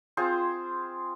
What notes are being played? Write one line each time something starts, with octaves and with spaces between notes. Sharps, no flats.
C4 F4 G#4 C5